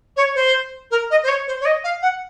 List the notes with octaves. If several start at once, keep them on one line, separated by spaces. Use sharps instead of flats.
C#5
C5
A#4
D#5
C5
C#5
C5
C#5
D#5
F5
F#5